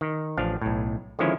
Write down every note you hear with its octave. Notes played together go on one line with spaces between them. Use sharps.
D#3
A1 F3 D4 F5
B1 A2
D3 D#3 F3 G#3 C#4 E4